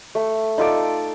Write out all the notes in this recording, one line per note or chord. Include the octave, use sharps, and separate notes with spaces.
A3
D#4 F4 A4 D5